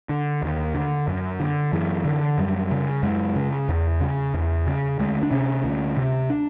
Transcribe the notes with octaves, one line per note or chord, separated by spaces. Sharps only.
D3
D#2
D3
F#2
D3
F#2 E3
D3
F#2 G3
C#3
F#2 G#3
C#3
E2
C#3
E2
C#3
D2 G#3
D4
C3 C#4
D2
C3
D4